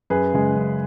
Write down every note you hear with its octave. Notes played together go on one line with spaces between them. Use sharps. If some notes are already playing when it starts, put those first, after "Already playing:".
F#2 G#4 B4
C#3 G#3
F#2